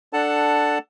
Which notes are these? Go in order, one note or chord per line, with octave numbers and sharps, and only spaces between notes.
D4 A4 F#5 A5